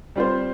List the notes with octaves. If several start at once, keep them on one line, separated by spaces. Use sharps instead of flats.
G3 C4 F4 C5